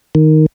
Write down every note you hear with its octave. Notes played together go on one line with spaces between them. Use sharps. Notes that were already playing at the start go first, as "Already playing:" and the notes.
D#3